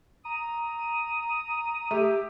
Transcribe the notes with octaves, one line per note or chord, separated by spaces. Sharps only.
A#5 D#6
A3 G4